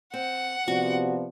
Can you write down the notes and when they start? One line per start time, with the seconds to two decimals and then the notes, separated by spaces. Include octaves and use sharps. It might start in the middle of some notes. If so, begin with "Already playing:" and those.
0.14 C4 F#5
0.68 C3 F3 B3 F#4 D5